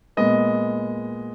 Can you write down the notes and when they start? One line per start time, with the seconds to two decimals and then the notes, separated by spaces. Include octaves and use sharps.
0.17 A#2 G#3 B3 D#5